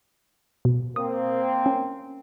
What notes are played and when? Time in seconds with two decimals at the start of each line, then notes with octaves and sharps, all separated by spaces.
0.65 B2
0.96 A#3 C4 D#6
1.66 C#4